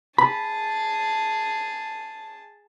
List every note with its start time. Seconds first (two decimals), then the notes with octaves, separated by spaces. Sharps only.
0.18 G#4 A5 B5